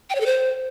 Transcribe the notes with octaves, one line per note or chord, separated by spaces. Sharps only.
G5
C#5
A4
C5